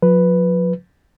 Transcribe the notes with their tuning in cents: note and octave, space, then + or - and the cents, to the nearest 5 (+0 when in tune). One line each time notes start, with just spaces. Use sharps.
F3 +45 B4 +0